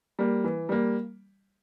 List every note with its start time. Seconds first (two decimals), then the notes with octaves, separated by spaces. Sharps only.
0.19 G3 A#3
0.44 E3
0.69 G3 A#3